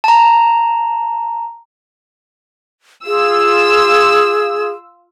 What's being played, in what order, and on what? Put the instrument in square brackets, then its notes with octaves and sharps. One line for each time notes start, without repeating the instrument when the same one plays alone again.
[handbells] A5 A#5
[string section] F4 E6 [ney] G#4